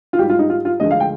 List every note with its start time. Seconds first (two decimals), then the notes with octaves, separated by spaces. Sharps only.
0.13 F4
0.19 G#2 G4
0.22 G3
0.30 F4
0.39 D#4
0.50 F4
0.65 F4
0.80 D2 D3 F3 G#3 D#5
0.91 F5
1.00 G5